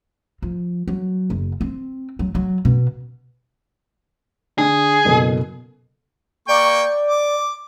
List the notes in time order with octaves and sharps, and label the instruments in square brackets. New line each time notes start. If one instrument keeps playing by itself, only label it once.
[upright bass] F3
F#3
F#1
C4
F#3
F#3
B2
[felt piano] D3 [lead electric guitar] G#4
[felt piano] F#1 B2 A4
[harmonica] A#3 G5 C#6 [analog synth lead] D5
[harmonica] D6